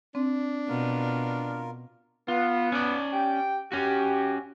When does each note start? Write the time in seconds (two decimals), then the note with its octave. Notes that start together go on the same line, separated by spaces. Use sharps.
0.15 C4 D4
0.68 B2 F4 A#4
2.28 B3 F4
2.72 C#4 D5
3.13 G4 G5
3.72 C#4 F#4 G4